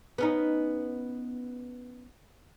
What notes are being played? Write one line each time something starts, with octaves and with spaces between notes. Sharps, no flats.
B3 C#4 D#4